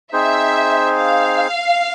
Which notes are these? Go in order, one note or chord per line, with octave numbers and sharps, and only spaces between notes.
C4 D#4 G#4 C5 E5
F5